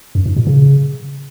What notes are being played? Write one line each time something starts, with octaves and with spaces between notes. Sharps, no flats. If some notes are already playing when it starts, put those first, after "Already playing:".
F#2
G#2
A#2
C#3